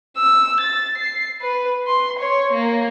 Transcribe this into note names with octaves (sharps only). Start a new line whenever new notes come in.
E6
A6
C7
B4
C6
C#5
A#3